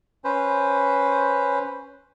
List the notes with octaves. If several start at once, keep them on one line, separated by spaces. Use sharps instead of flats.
C#4 B4 C5